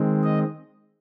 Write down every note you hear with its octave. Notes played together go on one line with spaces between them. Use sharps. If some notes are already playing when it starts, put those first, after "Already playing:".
Already playing: D#3 G#3 C4
D#5